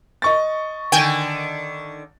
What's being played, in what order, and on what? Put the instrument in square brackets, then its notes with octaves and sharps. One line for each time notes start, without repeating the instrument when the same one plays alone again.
[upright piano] D#5 C#6 A6
[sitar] D3 D#3 [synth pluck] G5 G#5